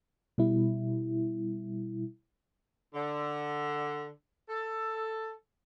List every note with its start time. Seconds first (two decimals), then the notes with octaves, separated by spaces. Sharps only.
0.38 B2 G3 E4
2.95 D3
4.50 A4